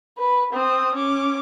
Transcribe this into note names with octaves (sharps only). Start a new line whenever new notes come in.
B4
C4 D#6
C#4 D6